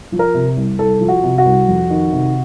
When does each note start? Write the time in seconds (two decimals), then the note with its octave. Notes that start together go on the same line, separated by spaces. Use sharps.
0.12 F3
0.19 A#4
0.34 C3
0.57 C2
0.79 C2 A4
1.01 F3
1.08 F#4
1.23 C3
1.38 F#4
1.45 C2
1.68 F2
1.90 D#3
2.12 C3